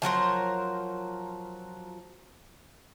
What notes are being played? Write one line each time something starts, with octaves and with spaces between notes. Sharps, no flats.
F3 F#3 A#4 C5